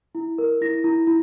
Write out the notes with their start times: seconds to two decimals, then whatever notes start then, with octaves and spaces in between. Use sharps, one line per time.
0.15 E4
0.38 A#4
0.61 E4 A#6
0.84 E4
1.07 E4